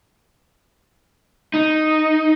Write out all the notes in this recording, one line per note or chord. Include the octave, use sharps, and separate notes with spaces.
D#4